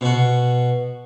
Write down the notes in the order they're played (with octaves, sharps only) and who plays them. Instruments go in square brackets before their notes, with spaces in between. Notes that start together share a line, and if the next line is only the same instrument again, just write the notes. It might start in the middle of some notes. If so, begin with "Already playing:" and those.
[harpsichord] B2 F#4